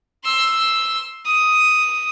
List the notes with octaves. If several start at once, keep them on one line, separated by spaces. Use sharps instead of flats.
C6 E6
D#6